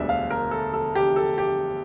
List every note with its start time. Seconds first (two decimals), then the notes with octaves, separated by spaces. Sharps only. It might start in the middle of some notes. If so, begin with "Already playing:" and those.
Already playing: E1 D2 D3 G3 D4 E5
0.09 F5
0.30 A#4
0.51 A4
0.74 A4
0.95 G4
1.16 A4
1.38 G4